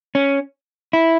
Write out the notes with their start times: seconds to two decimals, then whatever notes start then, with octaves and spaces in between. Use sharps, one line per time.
0.15 C#4
0.93 E4